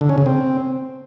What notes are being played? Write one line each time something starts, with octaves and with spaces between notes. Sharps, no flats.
D3
C#4
C#3
C4